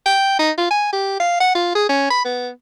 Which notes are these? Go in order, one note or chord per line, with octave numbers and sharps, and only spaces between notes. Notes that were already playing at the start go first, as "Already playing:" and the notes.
G5
D#4
F4
G#5
G4
F5
F#5
F4
G#4
C#4
B5
B3